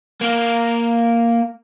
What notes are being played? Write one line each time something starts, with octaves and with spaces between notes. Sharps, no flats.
A#3